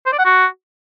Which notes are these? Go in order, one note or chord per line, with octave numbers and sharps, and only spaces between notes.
C5
D5
F#5
F#4